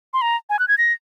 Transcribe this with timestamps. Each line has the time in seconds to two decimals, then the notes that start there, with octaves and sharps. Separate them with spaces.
0.13 C6
0.22 A#5
0.50 G#5
0.59 F#6
0.68 G#6
0.78 A#6